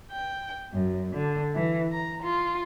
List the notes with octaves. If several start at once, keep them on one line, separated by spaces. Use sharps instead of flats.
G5
F#2
D3
E3
A#5
F4